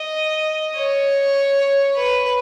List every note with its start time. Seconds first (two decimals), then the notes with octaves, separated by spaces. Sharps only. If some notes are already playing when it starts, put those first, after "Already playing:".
Already playing: D#5
0.76 C#5
1.97 B4